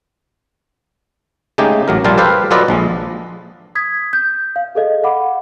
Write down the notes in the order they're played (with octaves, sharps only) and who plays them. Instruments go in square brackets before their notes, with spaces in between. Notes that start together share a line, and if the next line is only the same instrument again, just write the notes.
[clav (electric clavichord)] C#3 G#3 A3 D#4 G4
A1 F#3 A#4
A#1 A#2 G3 F4 F5 A5
G4 A4 B4 C5 F5
F#3 F4 A4 B4 D5 D#5
A#1 F3 G#3
[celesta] D#6 G#6 B6
G6
F5
G#4 A4 D#5 F5
F5 F#5 B5 D6